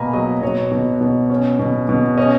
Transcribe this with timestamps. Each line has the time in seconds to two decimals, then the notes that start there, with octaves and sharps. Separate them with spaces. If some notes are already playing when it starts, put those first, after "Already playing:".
Already playing: B2 A#3 G#5 A#5 B5
0.13 F#3 D#5
0.42 B2 C#5
0.71 B2
1.01 B2
1.30 C#4
1.59 B2
1.89 B2
2.18 C#4 D#5